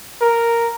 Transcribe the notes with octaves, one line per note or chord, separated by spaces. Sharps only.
A#4